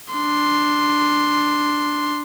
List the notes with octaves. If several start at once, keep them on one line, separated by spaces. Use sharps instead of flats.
D4 C6